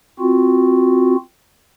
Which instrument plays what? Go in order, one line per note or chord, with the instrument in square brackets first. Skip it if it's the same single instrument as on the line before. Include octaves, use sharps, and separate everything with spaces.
[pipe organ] C4 F4 F#4